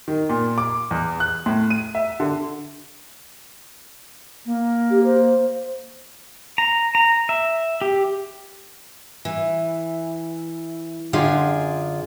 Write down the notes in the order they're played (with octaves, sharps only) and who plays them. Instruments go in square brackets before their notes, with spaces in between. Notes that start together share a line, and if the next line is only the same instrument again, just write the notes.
[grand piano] D#3
A#2
D6
E2
F#6
A2
D#7
E5
D3
[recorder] A#3
[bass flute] G4
C5
[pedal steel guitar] A#5
A#5
E5
G4
[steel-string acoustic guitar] E3
F#2 D3 F4 G#4 G5